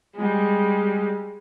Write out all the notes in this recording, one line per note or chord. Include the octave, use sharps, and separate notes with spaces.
G3 G#3